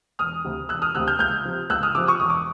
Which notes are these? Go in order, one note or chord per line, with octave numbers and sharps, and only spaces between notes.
E1 D#6 F6
D2 C3
E1 E6 F#6
D#6 F6
D2 C3 E6 F#6
F6 G6
C#2 F6 G6
C3 F3
C#2 E6 F#6
D#6 F6
C3 F3 D6 E6
C#6 D#6
E1 D#6
D6